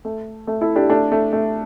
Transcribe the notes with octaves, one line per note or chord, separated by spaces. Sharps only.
A3
A3
E4 A4
D4 G4
A3 D4
A3
A3